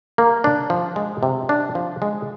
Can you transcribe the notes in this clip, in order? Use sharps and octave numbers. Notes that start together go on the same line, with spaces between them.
A#3
D4
F3
G#3
C3
D4
F3
G#3